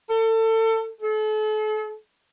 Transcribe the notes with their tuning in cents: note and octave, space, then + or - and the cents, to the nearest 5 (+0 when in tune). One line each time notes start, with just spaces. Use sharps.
A4 +30
A4 -40